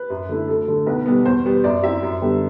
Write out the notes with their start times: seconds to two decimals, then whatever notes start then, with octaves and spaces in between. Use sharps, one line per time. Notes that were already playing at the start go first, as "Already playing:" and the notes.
Already playing: B4
0.10 F#2
0.29 D3 A3 E4
0.48 D2 A4
0.68 D3 A3
0.86 B1 B4
1.06 B2 G3 B3
1.25 E2 C5
1.45 B2 G3 B3
1.64 F#2 D5
1.82 F#3 C4 E4 E5
2.03 F#2
2.21 D3 G3 B3